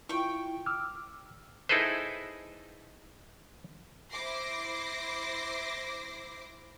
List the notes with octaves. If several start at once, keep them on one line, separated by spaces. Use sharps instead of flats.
E4 F4 G5 C#6
D6 E6 F6
D#4 E4 G#4 A4 B4 C5
E4 C5 D6 A#6 C7